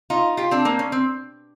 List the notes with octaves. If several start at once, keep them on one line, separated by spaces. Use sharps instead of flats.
D#4 F4
F4 G4
C4 D4
A#3 C4
C#4
C4